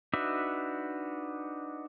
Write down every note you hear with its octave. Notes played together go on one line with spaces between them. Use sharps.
D4 D#4 F#4 B4 E5